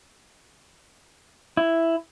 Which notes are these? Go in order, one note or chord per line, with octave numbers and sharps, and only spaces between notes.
E4